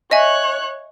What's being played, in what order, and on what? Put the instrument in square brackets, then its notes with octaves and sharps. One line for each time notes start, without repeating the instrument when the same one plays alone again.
[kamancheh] C#5 F#6 [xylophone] D#5 E5 G#5